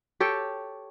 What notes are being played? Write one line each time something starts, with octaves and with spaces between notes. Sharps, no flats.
G4 A4 C#5 G5